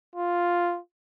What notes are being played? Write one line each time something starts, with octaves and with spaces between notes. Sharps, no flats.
F4